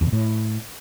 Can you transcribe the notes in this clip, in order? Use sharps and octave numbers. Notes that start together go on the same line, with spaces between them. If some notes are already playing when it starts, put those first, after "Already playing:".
E2
B2
A2